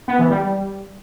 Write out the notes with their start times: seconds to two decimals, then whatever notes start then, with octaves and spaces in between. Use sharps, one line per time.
0.08 B3
0.19 E3
0.30 G3